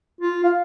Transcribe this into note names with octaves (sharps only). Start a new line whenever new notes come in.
F4
F5